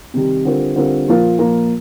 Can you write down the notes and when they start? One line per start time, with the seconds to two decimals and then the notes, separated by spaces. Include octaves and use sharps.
0.14 C3 D#3 G3
0.45 D3 G3 C4 F4 A#4
0.76 D3 G3 C4 F4 A#4
1.07 A#2 F3 A#3 F4 A#4
1.39 A#2 F3 A#3 F4 A#4